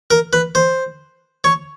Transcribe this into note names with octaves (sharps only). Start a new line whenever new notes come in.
A#4
B4
C5
C#5